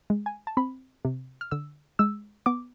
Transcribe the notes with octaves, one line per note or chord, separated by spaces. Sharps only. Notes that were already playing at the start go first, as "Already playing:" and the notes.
G#3
G#5
A5
C4 B5
C3
F6
D3 E6
G#3 E6
B3 D6